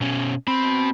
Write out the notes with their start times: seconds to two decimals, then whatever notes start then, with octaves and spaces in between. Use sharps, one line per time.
0.01 B2 C#4
0.48 B2 C4 B5